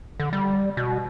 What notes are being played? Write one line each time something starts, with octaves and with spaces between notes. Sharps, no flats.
D3
G3
B2